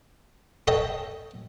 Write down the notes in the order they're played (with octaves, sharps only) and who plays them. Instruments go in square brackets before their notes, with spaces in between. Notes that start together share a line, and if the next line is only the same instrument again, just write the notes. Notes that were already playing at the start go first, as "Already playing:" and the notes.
[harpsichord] A4 C#5 D#5 G5 A5